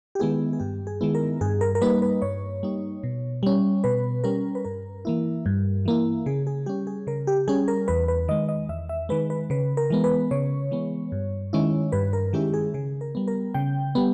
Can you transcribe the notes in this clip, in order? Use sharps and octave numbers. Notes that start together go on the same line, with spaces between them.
G4
D#3 G#3 B3 E4 G#4
G#4
G2 G4
G#4
D#3 G#3 B3 E4
A#4
G2 G#4
A#4
A#4
G3 A#3 D#4 B4
B4
G2 C#5
G3 A#3 D#4
B2
G3 C#4
B2 B4
G3 C#4 A#4
B4
G2 A#4
E3 A#3 E4
G2
E3 A#3 E4
C#3 G#4
G#4
G3 C#4 G4
G#4
C#3 A#4
G4
G3 C#4 G#4
A#4
E2 B4
B4
D#3 G#3 D#5
D#5
E2 E5
E5
D#3 G#3 B4
B4
C#3 B4
A#4
E3 G#3 B3
B4
C#3 C#5
E3 G#3 B3
G2
D#3 G#3 C#4 E4
G2 B4
A#4
D#3 G#3 C#4 E4 G4
G#4
C#3 G#4
A#4
G3 B3
A#4
C#3 G5
G3 B3